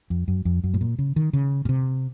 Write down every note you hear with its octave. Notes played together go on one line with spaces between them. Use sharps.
F2
F#2
F2
F#2
A2
A#2
C#3
D#3
C#3
A#2
C3